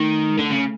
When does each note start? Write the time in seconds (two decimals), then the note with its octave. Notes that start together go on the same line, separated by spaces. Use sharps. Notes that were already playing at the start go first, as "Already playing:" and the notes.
Already playing: D#3 A3
0.31 G#3
0.39 D3 A3
0.51 C#3